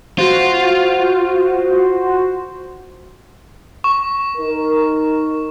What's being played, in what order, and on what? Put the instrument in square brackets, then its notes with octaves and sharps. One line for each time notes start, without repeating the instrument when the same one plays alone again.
[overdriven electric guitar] F4 [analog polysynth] F#4 C5
[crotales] C#6
[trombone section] D#4 A#4